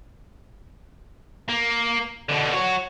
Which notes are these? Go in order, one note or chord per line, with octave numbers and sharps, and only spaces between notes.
A#3
B2 D3
F#4 C#5